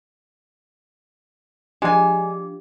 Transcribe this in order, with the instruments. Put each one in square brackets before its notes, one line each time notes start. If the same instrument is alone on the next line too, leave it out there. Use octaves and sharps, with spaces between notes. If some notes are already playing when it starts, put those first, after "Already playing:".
[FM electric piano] F3 D4 [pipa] G#3 G#5 [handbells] G4